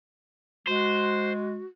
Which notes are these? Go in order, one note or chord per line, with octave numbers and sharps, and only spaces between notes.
G#3 F#4 C5